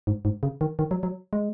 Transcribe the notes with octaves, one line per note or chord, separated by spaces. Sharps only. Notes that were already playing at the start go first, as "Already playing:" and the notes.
G#2
G#2
C#3
D#3
D#3
F#3
F#3
G#3